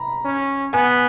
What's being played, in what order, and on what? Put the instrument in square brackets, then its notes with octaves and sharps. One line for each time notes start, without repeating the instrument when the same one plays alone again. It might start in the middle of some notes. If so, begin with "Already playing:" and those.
Already playing: [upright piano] A#5 B5
[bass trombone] C#4
[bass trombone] B3 [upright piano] G#5